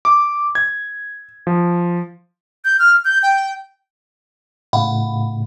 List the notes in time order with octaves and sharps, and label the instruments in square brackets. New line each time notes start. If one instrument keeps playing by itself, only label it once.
[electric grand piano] D6
G#6
F3
[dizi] G6
F6
G6
G5
[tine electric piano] A2 C#3 A3 [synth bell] F5 F#5 B5